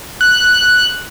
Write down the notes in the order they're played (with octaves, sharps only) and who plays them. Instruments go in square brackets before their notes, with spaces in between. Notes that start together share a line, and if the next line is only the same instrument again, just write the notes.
[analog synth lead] F#6